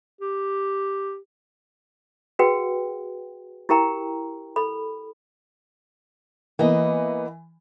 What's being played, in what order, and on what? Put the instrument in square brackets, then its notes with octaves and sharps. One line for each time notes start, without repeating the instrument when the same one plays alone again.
[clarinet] G4
[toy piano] F#4 G#4 B4 F#5 G5
E4 G4 A#4 G5 A#5
A4 B5
[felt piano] E3 [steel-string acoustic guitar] A#3 B3 D#5